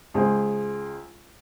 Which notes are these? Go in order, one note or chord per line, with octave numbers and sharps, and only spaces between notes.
C#2 G#4 C5